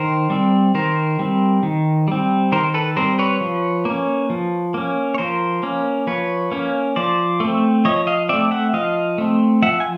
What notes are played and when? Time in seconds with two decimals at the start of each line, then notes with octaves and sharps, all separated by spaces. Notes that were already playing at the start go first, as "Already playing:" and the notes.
Already playing: D#3 A#4 C5
0.30 G3 C4
0.74 D#3 A#4 C5
1.19 G3 C4
1.63 D#3
2.08 G3 C4
2.52 D#3 A#4 C5
2.74 A4 B4
2.97 G3 C4 A#4 C5
3.19 B4 C#5
3.41 F3
3.85 A#3 C#4
4.30 F3
4.74 A#3 C#4
5.14 C#5
5.18 F3 A#4 C5
5.63 A#3 C#4
6.07 F3 B4 C#5
6.52 A#3 C#4
6.96 F3 C5 D5
7.40 A3 C4
7.85 F3 C#5 D#5
8.07 D#5 F5
8.29 A3 C4 D5 E5
8.51 E5 F#5
8.73 F3 D#5 F5
9.18 A3 C4
9.62 F3 E5 F#5
9.80 G#5